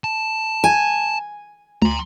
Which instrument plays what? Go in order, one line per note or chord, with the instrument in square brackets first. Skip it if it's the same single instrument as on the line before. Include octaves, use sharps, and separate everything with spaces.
[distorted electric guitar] A5
[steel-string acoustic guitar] G#5
[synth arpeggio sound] D2 [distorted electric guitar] A#5 C6